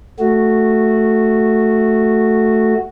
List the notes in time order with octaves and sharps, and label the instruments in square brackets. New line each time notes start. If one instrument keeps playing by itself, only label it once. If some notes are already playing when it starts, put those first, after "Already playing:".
[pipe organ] A3 F#4